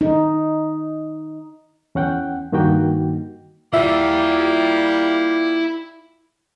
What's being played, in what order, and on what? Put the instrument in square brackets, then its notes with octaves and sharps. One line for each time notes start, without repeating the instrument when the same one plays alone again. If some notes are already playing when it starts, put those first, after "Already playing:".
[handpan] D#4
[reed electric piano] E2 C#4 F#5 G5
G2 D#3 A#3 D#4 F#4 G5
[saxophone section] G3 A#3 [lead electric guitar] E4 F#5 [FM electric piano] F4 E5